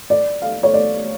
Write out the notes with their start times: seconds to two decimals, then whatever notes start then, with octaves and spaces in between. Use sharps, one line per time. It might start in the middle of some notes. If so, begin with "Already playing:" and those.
0.10 D5
0.42 F5
0.63 C#5
0.74 D5